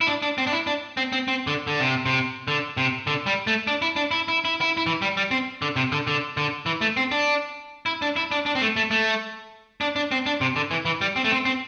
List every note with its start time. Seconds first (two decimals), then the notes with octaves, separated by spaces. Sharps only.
0.01 E4
0.07 D4
0.22 D4
0.38 C4
0.47 D4
0.52 E4
0.67 D4
0.97 C4
1.12 C4
1.28 C4
1.47 D3
1.67 D3
1.80 C3
2.06 C3
2.48 D3
2.77 C3
3.07 D3
3.26 G3
3.47 A3
3.67 D4
3.82 E4
3.96 D4
4.11 E4
4.28 E4
4.45 E4
4.61 E4
4.77 E4
4.87 E3
5.02 G3
5.17 G3
5.31 C4
5.62 D3
5.76 C3
5.92 D3
6.07 D3
6.37 D3
6.66 E3
6.81 A3
6.97 C4
7.11 D4
7.86 E4
8.02 D4
8.16 E4
8.31 D4
8.46 D4
8.55 C4
8.61 A3
8.76 A3
8.91 A3
9.81 D4
9.96 D4
10.11 C4
10.26 D4
10.41 C3
10.56 D3
10.71 E3
10.85 E3
11.01 G3
11.16 C4
11.24 A3
11.31 C4
11.45 C4